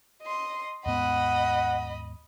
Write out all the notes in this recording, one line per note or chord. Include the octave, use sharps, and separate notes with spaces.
D#5 C6
D#2 G#2 B3 D#5 F#5 B5